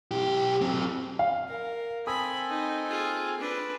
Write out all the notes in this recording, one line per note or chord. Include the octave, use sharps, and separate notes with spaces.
B1 G4
F#3 C4
F5
A#4
C4 A4 G#5 B5 D#6
D#4
F4 G#4
D4 B4